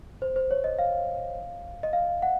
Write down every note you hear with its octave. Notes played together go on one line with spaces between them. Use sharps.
C5
C5
C#5
D#5
F5
D#5
F5
F#5